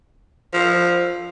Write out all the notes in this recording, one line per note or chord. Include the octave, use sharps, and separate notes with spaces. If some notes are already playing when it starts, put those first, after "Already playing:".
F3